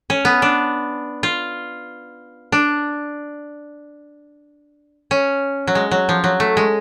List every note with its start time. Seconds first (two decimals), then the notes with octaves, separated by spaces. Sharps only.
0.10 C#4
0.25 B3
0.42 D4
1.23 F4
2.52 D4
5.11 C#4
5.67 F#3
5.75 G#3
5.91 F#3
6.09 F3
6.24 F#3
6.40 A3
6.57 G#3